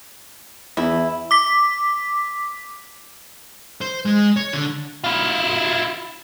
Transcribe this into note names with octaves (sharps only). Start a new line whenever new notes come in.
E2 E4
D6 B6
C5
G#3
C#5
D3
E4 F4